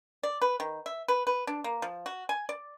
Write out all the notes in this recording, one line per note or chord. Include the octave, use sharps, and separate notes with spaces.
D5
B4
D#3
E5
B4
B4
D4
A#3
F3
F#4
G#5
D5